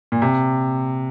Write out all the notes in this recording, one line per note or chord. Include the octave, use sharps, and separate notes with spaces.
A#2
C3